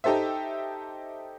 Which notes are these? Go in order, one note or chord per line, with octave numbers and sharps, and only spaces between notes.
D#4 G4 A4 C5 E5